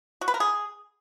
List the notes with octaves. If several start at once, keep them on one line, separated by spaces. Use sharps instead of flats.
F#4
B4
A#4
G#4